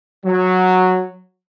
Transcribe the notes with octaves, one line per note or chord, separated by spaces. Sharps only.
F#3